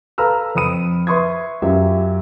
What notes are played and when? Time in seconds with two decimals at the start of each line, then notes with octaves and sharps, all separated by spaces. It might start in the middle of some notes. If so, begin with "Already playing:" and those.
0.18 A4 B4 F5 A#5 E6 F6
0.55 F2 B5 D#6 D#7
1.07 B4 E5 C6 C#6 D#6 G#6
1.62 F#2 F4 G4 E5